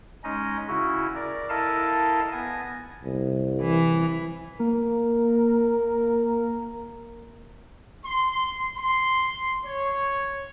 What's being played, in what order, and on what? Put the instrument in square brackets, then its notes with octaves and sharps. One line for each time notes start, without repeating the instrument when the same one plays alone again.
[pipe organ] G#3 C#4 D#4 D#5
C#3 C#4 E4 F#4
A#4 D5
E4 A4 A#4 D#5 F5 A5
B3 G#5 A#6
[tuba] C2
[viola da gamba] E3
[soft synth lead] A#3 [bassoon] A#4
[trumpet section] C6
C6
C#5